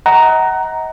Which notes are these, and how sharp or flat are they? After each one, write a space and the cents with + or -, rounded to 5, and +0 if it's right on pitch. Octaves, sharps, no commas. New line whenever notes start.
D#5 +35 F#5 +25 A#5 +0